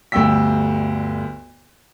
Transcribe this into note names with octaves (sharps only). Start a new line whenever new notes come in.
G1 D2 G3 G5 E6 B6